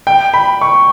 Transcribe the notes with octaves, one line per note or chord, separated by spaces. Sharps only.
G5
B5
C#6